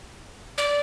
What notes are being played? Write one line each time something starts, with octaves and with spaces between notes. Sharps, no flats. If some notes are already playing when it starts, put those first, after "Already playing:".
D5